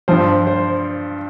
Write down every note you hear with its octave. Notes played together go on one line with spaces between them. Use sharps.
G2 F3 C5
C5